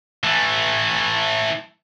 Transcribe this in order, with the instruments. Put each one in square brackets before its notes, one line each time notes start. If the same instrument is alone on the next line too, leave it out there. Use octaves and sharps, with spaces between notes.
[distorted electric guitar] E3 A3